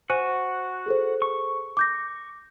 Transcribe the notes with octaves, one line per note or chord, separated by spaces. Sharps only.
F#4 C5 F#5 G#5 D#7
G#4 A4 C5
C#6
D6 G6 A#6